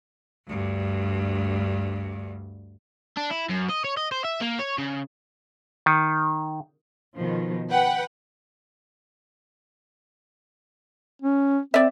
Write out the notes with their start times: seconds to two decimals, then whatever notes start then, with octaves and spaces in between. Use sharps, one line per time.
0.47 D2 G2
3.17 D4
3.31 E4
3.49 F#2
3.69 D#5
3.84 C#5
3.97 D#5
4.12 C5
4.25 E5
4.41 A#3
4.59 C#5
4.78 C#3
5.86 D#3
7.17 B2 D#3 F3
7.70 B4 F#5 G5 B5
11.22 C#4
11.74 C4 D5 E5